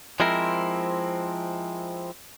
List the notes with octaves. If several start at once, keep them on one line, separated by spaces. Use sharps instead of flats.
F3 G#3 C4 E4 A#4